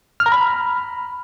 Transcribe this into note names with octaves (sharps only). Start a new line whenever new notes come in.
F6
A#5
B5